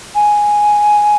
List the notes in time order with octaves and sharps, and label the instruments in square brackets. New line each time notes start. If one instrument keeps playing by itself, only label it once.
[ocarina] G#5